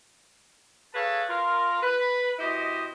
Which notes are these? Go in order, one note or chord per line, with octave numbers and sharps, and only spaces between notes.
G#4 A4 B4 C#5 F5 A5
F4 A#4
B4
B2 E4 G4 C5 D#5